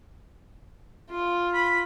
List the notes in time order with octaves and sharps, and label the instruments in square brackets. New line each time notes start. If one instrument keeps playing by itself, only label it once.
[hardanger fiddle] F4
[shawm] B5